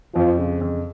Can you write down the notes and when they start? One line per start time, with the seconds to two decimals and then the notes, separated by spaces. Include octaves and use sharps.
0.14 F2 F3
0.37 C#3
0.61 F2